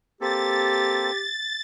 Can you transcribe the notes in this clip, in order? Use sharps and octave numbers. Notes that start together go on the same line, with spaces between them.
A#3 C4 G4 A4 A6